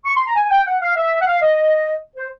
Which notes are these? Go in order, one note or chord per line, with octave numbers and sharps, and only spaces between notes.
C#6
C6
A#5
G#5
G5
F#5
F5
E5
F#5
F5
D#5
C5